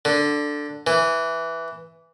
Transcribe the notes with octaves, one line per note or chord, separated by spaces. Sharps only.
D3
E3